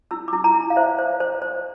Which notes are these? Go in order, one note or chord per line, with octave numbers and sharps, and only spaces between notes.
E4 E6
D6
E4
A#5
E4
F5
C5 E5
C5
C5
C5